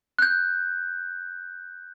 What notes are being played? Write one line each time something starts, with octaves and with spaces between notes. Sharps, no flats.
F#6 G6